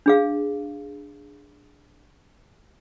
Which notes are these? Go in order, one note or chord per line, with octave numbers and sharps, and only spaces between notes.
D4 G#4 F5